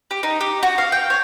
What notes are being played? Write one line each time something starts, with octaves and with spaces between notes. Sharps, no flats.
G4
D#4
G4
F#4
F5
G5
C#5